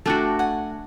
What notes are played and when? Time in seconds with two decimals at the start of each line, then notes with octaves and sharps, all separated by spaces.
0.06 A3 D4 F#4 G5 A5
0.39 F#5 G#5